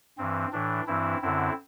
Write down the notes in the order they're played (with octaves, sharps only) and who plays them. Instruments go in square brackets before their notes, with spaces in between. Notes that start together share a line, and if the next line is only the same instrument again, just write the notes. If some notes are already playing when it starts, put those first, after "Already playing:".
[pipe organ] G2 E3 C4
A2 E3 D4
G2 E3 C4 E4
F#2 D3 C4 E4